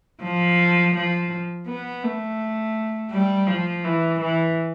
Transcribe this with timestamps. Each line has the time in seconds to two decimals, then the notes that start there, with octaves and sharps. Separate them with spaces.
0.23 F3
0.95 F3
1.67 B3
2.04 A3
3.11 G3
3.47 F3
3.84 E3
4.20 E3